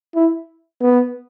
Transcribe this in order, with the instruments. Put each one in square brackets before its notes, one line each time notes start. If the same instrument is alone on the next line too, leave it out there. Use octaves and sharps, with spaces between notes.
[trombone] E4
B3